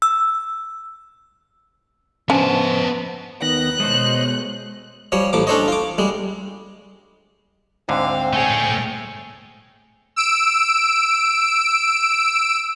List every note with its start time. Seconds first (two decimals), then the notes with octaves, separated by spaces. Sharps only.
0.02 E6
2.30 F3 B3 C#4 D4 A5
3.42 D#2 D#3 B3 F#6 A#6
3.80 B2 G#3 A4 C5 C#5 D#5
5.12 F3 G3 C#5
5.33 A1 F3 D6
5.47 C#4 D4 A4 C5 C#5 D#5
5.68 F4 D6
5.98 G3 G#3
7.89 D2 G#2 D3 C4 F5
8.33 A3 G#4 C#5 G5
10.16 E6 D7